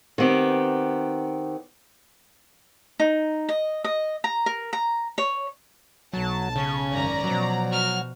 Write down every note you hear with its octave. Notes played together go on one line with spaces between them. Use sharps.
D#3 B3 C4 G4
D#4
D#5
D#5
A#5
A#4
A#5
C#5
B1 F#3 A5
C#3 C#4
G#1 F#2 D5 A#5
B2 F3 F#3
F#4 F6